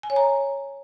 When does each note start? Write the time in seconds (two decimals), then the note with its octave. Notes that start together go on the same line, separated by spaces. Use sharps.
0.03 G#5
0.10 C#5
0.16 A#5